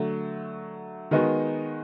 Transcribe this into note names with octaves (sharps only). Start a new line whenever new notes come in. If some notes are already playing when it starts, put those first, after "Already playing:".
Already playing: D3 F#3 A3
D#3 G#3 B3 D#4 F#4